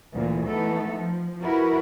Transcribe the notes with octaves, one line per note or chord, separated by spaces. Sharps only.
D2 A#2 E3
E3 A3 B3 D#4 A4
F3
E4 F#4 A#4 B4